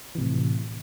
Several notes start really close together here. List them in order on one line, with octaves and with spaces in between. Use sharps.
E3 C3 A2